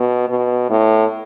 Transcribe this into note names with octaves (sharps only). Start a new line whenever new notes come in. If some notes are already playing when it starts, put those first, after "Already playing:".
Already playing: B2
B2
A2